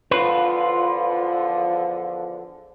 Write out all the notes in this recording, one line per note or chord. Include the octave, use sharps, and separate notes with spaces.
E2 D3 F3 F4 B4